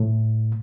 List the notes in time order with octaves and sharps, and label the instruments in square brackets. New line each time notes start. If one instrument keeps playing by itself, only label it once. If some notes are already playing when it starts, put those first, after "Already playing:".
Already playing: [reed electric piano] A2